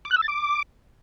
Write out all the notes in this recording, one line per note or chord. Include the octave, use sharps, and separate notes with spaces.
D6
F#6
E6
A6
D6